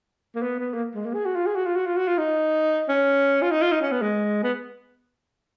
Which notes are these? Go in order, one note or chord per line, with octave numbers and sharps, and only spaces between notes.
A#3
B3
B3
A#3
G#3
A#3
G#4
F#4
F4
G#4
F#4
F4
F#4
F4
F#4
F4
D#4
C#4
F4
D#4
F4
D#4
C#4
B3
G#3
B3